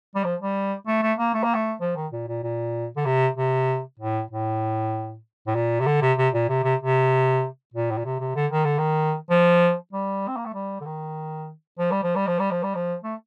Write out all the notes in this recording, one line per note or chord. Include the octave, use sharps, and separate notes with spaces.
G3
F3
G3
A3
A3
A#3
A3
A#3
A3
F3
D#3
A#2
A#2
A#2
D3
C3
C3
A2
A2
A2
A#2
C3
D3
C3
C3
A#2
C3
C3
C3
A#2
A2
A#2
C3
C3
D3
D#3
D3
D#3
F3
G3
C4
A#3
A3
G3
D3
D#3
F3
G3
F3
G3
F3
G3
F3
G3
F3
A3